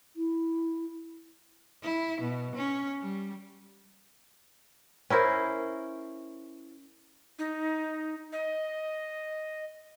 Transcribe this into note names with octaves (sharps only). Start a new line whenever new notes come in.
E4
E4
B2
C#4
G3
C#4 E4 A#4 C5
D#4
D#5